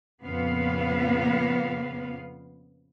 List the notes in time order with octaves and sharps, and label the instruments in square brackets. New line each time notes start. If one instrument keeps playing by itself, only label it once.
[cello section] F2 A#2 C#3 B3 F5